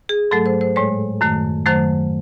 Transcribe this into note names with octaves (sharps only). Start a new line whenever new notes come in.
G#4
G#2 F#3 A3 A4
C5
C5
A2 G#3 C#5
F#2 D#3 A3
F#2 D#3 F#3 A3 C5